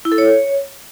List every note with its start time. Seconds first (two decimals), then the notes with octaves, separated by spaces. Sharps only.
0.05 E4
0.12 A4
0.18 C#5